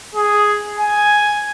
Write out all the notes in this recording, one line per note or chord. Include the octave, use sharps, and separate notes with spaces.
G#4
G#5